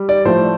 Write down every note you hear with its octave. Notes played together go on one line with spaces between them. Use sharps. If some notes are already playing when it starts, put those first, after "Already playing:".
Already playing: G3
D5
A2 F3 A3 C5